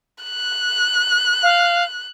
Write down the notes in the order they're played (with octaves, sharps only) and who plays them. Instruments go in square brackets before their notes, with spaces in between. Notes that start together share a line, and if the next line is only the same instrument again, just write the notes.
[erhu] F#6
[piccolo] F5